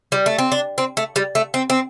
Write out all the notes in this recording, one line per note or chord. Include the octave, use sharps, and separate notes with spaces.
G3
A3
C4
D4
C4
A3
G3
A3
C4
C4